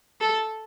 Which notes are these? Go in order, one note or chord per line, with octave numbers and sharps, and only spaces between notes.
A4